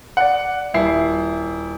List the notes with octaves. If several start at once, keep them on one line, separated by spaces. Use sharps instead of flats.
D5 F#5
D#1 E4 C7